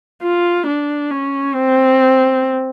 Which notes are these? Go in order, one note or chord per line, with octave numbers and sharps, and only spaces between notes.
F4
D4
C#4
C4